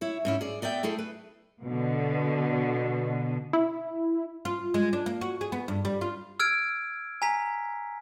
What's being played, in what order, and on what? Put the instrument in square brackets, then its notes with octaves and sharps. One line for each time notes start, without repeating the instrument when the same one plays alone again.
[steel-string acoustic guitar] E4 C#5
G#2 C#4 E4
G#4 D5
B3 D5 E5 G5
A3 E4 G#4 A4
B4
[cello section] B2 D3
[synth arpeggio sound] E4
[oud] F4
G#3
D4
A#3
F#4
G#4
B3
G2
G3
F4
[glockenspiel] E6 F6 G#6 D7
G#5 A#5 B6